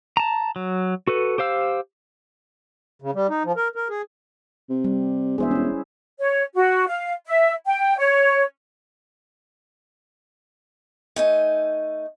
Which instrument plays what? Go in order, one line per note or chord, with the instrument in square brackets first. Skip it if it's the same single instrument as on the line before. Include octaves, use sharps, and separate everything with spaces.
[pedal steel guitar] A5 A#5
F#3
F#4 A4 B4
G4 C5 F5 E6
[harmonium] C#3
G3
D#4
F3
A#4
A#4
G#4
[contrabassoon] C3
[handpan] G3
[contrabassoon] E1 [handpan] G#4 C5 E5
[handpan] C#4 E4
[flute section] C#5
F#4
F5
E5
G5
C#5
[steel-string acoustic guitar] A3 D#4 G#5